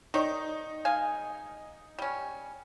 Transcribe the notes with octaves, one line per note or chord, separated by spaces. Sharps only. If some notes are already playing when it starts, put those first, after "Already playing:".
D#3 D#4 C#5 D5
G#3 F5 G#5
G3 C#4